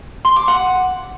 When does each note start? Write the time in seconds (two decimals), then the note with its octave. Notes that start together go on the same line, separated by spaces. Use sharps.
0.25 C6
0.36 D6
0.48 F#5